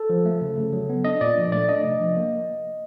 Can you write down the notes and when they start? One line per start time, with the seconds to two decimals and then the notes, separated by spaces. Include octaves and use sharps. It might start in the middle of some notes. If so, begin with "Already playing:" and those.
Already playing: A4
0.10 F3
0.25 A3
0.41 C#3
0.57 C#3
0.73 F#3
0.89 B3
1.04 D4 D#5
1.21 A#2 D5
1.37 F3
1.52 A3 D5
1.69 D4 D#5
1.84 C3
2.01 F3
2.16 A#3